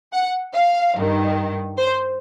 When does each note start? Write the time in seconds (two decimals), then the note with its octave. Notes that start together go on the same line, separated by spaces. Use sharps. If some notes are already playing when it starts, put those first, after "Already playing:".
0.13 F#5
0.54 F5
0.96 G2 D#3
1.77 C5